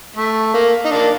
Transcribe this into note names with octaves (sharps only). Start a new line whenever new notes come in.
A3
A#3
D#4
A#3 D4